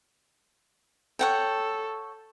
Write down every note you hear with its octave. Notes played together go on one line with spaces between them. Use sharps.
A4 C#5 F#5 G5